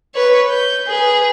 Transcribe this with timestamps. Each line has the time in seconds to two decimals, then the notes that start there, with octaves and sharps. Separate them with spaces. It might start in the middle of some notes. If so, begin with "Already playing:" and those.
0.15 B4 C#5
0.50 G6
0.88 G#4 B4